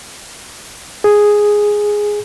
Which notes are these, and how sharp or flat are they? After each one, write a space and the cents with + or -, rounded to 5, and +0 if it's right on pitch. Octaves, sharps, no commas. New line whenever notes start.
G#4 +0